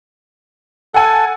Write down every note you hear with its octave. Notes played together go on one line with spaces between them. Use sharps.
A4 F#5 G#5